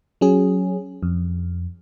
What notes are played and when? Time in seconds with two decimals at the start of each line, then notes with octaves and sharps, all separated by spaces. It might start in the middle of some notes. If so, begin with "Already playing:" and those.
0.21 F#3 C#4 G#4
1.03 F2